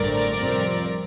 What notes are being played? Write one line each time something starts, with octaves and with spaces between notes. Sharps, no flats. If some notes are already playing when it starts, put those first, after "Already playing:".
Already playing: A1 G2 D3 A3 C4 A#4 D5
F2 C3 G3 C4